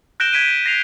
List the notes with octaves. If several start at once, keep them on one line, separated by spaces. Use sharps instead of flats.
F#6 G6 A#6 D7 E7 G7
G6 G#6 B6 D7 D#7
A#6 C7 F7